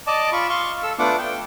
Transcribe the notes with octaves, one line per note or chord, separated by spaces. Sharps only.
D5 D#5 A5 D6
F4 B5 C#6
F5 C6 C#6
A4 E6
A3 B3 D4 F4 F#5 D6
G5